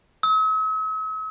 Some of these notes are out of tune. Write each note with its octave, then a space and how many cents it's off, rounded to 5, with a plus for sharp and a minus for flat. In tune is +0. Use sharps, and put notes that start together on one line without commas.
E6 -45